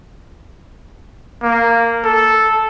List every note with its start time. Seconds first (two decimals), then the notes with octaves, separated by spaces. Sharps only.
1.42 A#3
2.04 A4